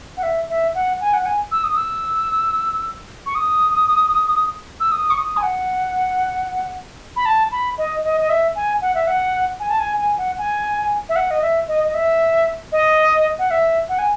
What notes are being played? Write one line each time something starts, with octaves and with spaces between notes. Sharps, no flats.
F#5
E5
E5
F#5
G#5
F#5
G#5
E6
D#6
E6
C#6
D#6
E6
D#6
C#6
D#6
G#5
F#5
B5
A5
B5
D#5
D#5
D#5
E5
G#5
F#5
E5
F#5
G#5
A5
G#5
G#5
F#5
G#5
E5
F#5
D#5
E5
D#5
D#5
E5
D#5
F#5
E5
F#5
G#5